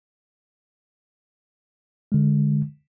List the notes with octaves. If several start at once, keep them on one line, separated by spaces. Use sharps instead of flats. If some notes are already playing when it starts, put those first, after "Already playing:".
D3 G#3